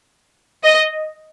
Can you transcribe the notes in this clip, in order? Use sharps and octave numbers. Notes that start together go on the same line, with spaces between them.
D#5